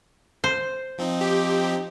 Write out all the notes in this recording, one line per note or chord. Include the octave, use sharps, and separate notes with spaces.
C5
F3 C4 D#4
G4